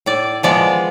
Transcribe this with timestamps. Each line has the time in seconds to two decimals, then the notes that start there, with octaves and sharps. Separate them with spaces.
0.06 A2 D5
0.43 F3 G#3 B3 D5